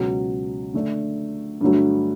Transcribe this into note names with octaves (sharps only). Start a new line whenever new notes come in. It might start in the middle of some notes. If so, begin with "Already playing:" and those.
Already playing: C#2 B2 F#3
D3 A3 D4
G2 D3 F#3 A3